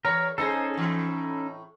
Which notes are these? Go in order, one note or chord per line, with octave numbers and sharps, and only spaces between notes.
E2 A#4 C#5
C#4 D#4 G#4 A4 C5
A2 E3